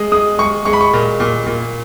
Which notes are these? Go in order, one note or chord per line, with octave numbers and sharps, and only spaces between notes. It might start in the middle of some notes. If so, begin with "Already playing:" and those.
Already playing: G#3 D#6
G#3 D#6
G#3 C#6
G#3 C#6
B5
C#6
A#2
A#2
A#2